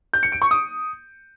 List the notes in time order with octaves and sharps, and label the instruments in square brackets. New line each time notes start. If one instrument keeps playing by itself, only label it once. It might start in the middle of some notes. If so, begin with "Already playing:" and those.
[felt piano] G6
C#7
D7
C#6
D#6